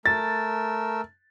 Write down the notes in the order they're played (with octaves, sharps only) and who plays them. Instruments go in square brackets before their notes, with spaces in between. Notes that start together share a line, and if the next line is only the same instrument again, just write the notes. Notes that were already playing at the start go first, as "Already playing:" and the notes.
[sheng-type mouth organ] A3 A#4 E6 [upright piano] A6